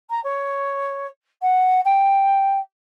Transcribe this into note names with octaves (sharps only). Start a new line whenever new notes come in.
A#5
C#5
F#5
G5